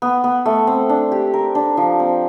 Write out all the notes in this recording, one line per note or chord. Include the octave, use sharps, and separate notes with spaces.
B3
B3
A3
C4
D4
G4
A#4
D4
F3
C4